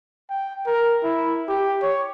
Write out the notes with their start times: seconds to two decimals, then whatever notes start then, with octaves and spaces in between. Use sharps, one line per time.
0.29 G5
0.67 A#4
1.04 E4
1.48 G4
1.82 C#5